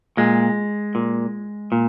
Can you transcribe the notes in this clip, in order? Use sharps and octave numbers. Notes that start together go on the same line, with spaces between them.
A#2 G#3
A#2
A#2